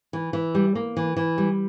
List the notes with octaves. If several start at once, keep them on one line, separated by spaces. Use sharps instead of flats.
E3
E3
G3
A#3
E3
E3
G3